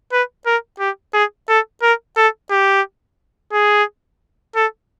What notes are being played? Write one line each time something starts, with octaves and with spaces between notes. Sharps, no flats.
B4
A#4
G4
G#4
A4
A#4
A4
G4
G#4
A4